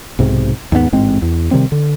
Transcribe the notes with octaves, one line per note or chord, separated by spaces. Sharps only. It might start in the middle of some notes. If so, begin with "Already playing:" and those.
B1 G#2 C3
D#2 G#2 G3 B3
A1 G#2 G#3 C4
E2
C3 D#3 G3 C4
D3